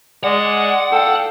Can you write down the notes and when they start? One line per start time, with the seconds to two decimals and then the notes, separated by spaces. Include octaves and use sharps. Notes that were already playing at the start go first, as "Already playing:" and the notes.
0.24 G#3 D5 F#5
0.92 A4 F5 G5